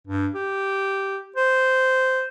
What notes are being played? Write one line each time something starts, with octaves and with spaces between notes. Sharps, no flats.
G2
G4
C5